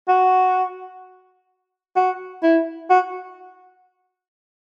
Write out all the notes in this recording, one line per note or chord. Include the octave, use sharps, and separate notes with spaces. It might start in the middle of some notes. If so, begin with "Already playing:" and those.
F#4
F#4
E4
F#4